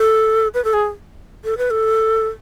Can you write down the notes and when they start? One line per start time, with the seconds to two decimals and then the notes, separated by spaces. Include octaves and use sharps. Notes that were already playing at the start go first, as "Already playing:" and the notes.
Already playing: A4
0.54 B4
0.64 A4
0.74 G#4
1.44 A4
1.58 B4
1.71 A4